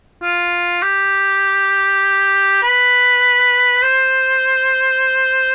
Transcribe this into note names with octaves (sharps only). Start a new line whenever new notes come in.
F4
G4
B4
C5